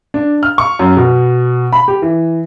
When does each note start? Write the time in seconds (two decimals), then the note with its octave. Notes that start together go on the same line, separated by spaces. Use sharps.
0.14 D4
0.43 F6
0.58 C#6
0.79 F#2
0.97 B2
1.73 B5
1.88 G4
2.02 E3